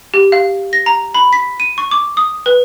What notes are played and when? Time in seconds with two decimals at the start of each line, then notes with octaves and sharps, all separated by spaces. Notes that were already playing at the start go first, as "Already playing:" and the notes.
0.14 G4
0.32 F5
0.73 A#6
0.86 A#5
1.14 B5
1.33 B6
1.60 D#7
1.78 C#6
1.91 D6
2.17 D#6
2.46 B4